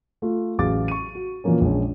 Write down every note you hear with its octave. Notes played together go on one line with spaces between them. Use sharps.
A3 F4
A1 F#3 G#4 F5 D6 A6
C#6 D#7
F#4
A#2 E3 F3 A#3 C#4
A#1 G#3 C#4